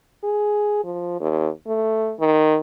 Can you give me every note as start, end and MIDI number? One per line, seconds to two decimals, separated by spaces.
0.23 0.79 68
0.84 1.18 53
1.20 1.49 39
1.67 2.14 57
2.19 2.58 51